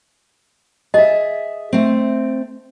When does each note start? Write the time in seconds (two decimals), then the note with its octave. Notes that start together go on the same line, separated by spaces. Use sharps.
0.94 G#4 D#5 E5
1.73 A3 C4